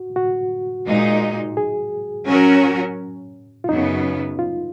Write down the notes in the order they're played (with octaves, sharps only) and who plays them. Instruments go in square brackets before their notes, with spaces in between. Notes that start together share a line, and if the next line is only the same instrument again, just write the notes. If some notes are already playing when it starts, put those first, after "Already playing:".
Already playing: [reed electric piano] F#4
F#4
[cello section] A#2 G#3 D#4
[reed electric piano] G#4
[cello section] F#3 C#4 F#4 A#4
[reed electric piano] F4
[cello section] F#2 C#3 F#3 B3 [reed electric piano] D#4
[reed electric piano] F4